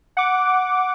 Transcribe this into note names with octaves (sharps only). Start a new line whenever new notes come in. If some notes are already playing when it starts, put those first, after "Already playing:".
F#5 D6